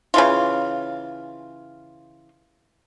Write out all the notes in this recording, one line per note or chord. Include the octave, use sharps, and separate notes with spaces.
C#3 E3 F4